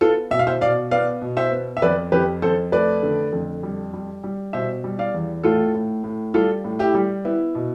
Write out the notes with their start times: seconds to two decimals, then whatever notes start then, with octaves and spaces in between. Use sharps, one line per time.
0.01 B3 F4 A4
0.31 B2 E5
0.39 F5
0.47 C5 E5
0.61 B2 D5 F5
0.91 B3 D5 F5
1.22 B2
1.37 C5 E5
1.52 B3
1.77 E5
1.82 F2 B4 D5
2.12 F2 G4 B4
2.42 F2 A4 C5
2.72 A3 B4 D5
3.03 D3
3.32 F2
3.63 G3
3.94 G3
4.24 G3
4.53 B2 C5 E5
4.84 G3
4.99 D5 F5
5.14 E2
5.44 A2 F4 A4
5.75 A2
6.04 A2
6.34 G3 F4 A4
6.65 A2
6.79 E4 G4
6.94 G3
7.25 B3 E4
7.55 B2